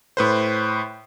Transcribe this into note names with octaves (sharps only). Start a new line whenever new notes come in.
A2 B4 C5